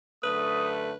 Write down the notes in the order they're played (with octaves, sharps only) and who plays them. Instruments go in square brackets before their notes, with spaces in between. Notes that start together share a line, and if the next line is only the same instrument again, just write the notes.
[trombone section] F#2 D3 A3 [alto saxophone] B4 [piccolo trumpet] D#6